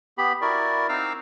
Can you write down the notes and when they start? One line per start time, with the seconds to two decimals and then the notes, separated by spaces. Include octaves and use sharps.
0.18 B3 G4 B5
0.41 E4 F#4 A#4 D5
0.89 C4 D#4 F5 D6 E6 F6